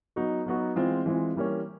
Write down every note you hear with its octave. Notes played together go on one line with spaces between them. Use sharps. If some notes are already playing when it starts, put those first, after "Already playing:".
F#3 B3 D#4 F#4
F#3 B3 D#4 F#4
E3 G#3 C4 F4
E3 G#3 C4 F4
E3 G3 A#3 C#4